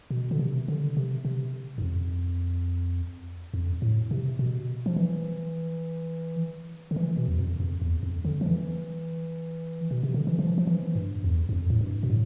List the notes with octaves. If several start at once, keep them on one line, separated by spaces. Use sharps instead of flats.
B2
D3
C3
D3
C3
C3
G2
F2
F2
A2
C3
B2
F3
E3
D3
E3
B2
E2
F2
F2
E2
F2
D3
F3
E3
B2
C3
D3
E3
F3
F3
E3
G2
E2
G2
F2
A2
G2
B2
A2